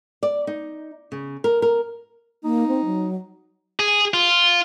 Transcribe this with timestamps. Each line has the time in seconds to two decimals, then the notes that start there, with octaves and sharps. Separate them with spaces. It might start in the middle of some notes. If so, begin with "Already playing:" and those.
0.23 D5
0.47 D#4
1.12 C#3
1.44 A#4
1.62 A#4
2.44 A#3 D#4
2.68 C4
2.85 F#3
3.80 G#4
4.14 F4